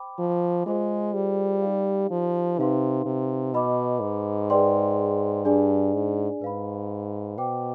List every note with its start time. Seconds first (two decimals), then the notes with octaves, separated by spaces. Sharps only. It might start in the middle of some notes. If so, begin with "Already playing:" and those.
Already playing: C5 G5 B5 D6
0.19 F3
0.66 G#3 F4 G#4 C5 F5
1.15 G3
1.62 D#4 G4 D5 F5
2.11 F3
2.59 C3 D#4 B4 F5 C6
3.06 C3
3.54 B2 B4 D#5 B5 D6
4.01 G#2
4.50 G#4 B4 D5 G5 C6
5.45 G2 D4 G#4 D5 G#5
5.94 G#2
6.41 G#2 B4 F5 B5
7.37 B2 C5 G5 D6